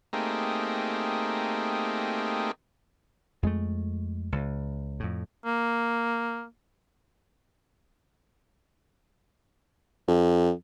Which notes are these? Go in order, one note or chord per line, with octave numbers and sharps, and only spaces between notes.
A3 A#3 C4 D#4 G4 G#4
F2 G#3 A3
C#2
F2 A2
A#3
F2